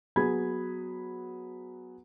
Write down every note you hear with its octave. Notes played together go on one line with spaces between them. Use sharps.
F#3 B3 G#4 B5 G#6